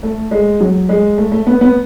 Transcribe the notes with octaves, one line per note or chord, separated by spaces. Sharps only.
A3
G#3
F#3
G#3
A3
A3
B3
B3